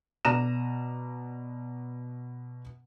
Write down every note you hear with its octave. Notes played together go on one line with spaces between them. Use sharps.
B2 D5 A#5 A#6 D#7 E7